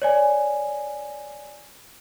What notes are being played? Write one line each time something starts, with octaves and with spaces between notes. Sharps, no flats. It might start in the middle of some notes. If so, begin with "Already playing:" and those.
C#5 D5 G#5